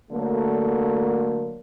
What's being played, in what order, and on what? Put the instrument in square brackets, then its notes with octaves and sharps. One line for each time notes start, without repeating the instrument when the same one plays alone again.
[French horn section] D3 F#3 A3 A#3